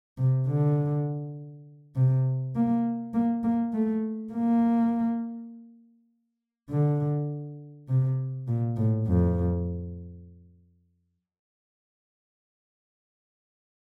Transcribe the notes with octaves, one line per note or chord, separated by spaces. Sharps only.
C3
D3
C3
A#3
A#3
A#3
A3
A#3
D3
C3
A#2
A2
F2